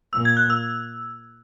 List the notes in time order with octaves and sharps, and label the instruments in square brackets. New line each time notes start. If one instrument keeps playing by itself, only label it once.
[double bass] A#2 [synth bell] E6
[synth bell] G#6
F#6
E6